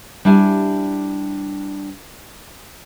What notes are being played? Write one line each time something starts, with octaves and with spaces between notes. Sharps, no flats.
G3 D4 E4 G4 G#5